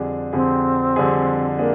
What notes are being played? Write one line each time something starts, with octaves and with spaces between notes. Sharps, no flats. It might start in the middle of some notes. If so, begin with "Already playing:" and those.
Already playing: F2 D3 G3 D4 G#4
F2 D3 G3 C4 D4 G#4
F2 D3 G3 D4 G#4
A#3 D4 G#4